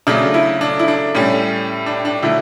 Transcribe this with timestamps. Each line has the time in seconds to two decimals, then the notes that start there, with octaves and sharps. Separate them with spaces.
0.07 C#3 F#3 A3 D4
0.34 E4
0.61 D4
0.79 E4
0.88 D4
1.15 A2 G3 C#4
1.86 D4
2.05 D4
2.23 D3 F#3 A3 E4